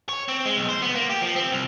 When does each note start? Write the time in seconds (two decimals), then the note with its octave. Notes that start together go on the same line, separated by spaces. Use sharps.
0.09 C#5
0.28 C4
0.46 G#3
0.57 B1
0.69 C5
0.82 B3
0.95 A#3
1.10 G4
1.21 F3
1.36 C4
1.52 C2